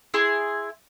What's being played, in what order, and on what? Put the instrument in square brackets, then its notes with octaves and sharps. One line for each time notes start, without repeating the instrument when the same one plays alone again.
[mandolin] E4 G#4 C6